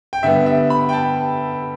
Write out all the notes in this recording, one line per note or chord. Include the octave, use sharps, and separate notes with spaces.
G5
D3 G3 B3 E5
E5
B5
G5
A5